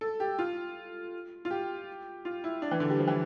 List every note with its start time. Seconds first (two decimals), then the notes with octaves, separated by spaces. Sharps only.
0.01 A4
0.20 G4
0.39 F4
1.45 F4
1.50 G4
2.25 F4
2.44 E4
2.62 D4
2.71 E3
2.80 D3
2.90 G3
2.99 F3
3.08 E3